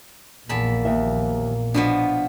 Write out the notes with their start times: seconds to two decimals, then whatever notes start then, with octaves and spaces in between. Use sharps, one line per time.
0.49 A#1 E2 A#3 A5 B5
0.85 D#2 E5
1.74 B2 F3 B3 D4